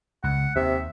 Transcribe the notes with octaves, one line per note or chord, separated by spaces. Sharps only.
C#2 F#5
D#2 C3 E5